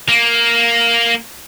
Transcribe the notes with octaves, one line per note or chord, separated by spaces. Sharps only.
A#3